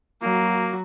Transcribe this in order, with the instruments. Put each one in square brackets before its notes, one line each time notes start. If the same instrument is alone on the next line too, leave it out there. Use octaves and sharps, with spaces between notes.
[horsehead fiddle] F#3 F#4 [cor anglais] A#3